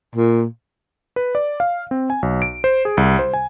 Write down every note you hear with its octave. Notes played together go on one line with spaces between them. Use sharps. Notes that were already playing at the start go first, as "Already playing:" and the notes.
A#2
B4
D5
F5
C4
G#5
B1
D7
C5
G#4
C2
C5
G#5